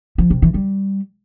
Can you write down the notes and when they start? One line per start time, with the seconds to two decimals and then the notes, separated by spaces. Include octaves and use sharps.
0.18 F3
0.30 C3
0.42 E3
0.54 G3